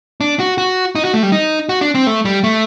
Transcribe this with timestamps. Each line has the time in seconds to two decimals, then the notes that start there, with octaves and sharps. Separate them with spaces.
0.21 D4
0.39 F#4
0.58 F#4
0.95 D#4
1.05 F#4
1.14 A3
1.23 G3
1.32 D#4
1.69 F#4
1.81 D4
1.95 C4
2.07 A3
2.25 G3
2.44 A3